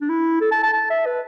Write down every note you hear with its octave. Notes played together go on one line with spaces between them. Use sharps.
D4
E4
A4
A5
A5
A5
E5
B4